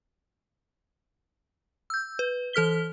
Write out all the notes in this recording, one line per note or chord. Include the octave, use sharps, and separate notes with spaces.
E6 G6
B4
E3 A4 F6 B6 G7